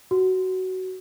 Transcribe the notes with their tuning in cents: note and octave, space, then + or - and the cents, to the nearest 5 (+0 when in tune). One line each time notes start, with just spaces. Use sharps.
F#4 +15